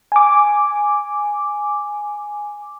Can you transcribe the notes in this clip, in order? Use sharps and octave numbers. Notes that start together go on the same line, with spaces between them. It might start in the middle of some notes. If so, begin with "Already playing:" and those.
G#5 D6